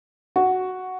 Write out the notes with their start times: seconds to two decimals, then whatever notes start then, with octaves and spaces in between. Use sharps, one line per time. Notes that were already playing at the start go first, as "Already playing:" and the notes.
0.36 F#4